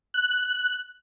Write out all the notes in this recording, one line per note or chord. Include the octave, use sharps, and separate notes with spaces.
F#6